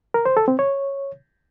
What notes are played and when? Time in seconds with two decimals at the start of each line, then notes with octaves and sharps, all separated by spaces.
0.14 A#4
0.26 C5
0.37 A4
0.48 C4
0.59 C#5